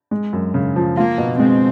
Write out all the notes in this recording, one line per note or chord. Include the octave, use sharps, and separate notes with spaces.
G#3
F#2
C#3
F3
A#3 F4
B2
G#3 C4